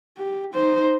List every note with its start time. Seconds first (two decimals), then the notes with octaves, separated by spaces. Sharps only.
0.17 G4
0.54 D#4 C5